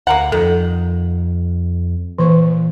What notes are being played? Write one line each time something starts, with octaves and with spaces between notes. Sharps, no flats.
D2 A#3 A#4 F#5
F2 D#3 A4
A#2 E3 C5 C#6